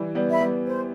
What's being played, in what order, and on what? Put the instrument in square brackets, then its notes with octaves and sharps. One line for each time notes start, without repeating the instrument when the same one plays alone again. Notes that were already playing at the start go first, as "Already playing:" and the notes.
Already playing: [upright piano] E3 G3
G3 B3
[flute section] E5 B5
[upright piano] G3 B3
[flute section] C5